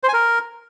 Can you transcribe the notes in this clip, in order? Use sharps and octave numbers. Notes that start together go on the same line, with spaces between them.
C5
G#5
A#4